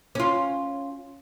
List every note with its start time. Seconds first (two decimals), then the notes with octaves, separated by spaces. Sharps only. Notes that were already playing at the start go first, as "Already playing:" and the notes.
0.15 C#4 F4